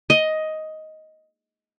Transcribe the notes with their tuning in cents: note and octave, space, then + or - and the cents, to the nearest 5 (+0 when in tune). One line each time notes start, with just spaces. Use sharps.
D#5 +10